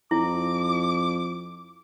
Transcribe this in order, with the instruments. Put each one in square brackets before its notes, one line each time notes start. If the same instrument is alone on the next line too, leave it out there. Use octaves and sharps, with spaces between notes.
[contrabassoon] F2 [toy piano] E4 [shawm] D6